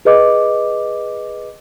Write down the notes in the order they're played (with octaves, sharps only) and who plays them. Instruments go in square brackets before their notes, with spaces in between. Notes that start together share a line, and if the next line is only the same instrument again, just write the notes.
[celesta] G#4 B4 D#5 D6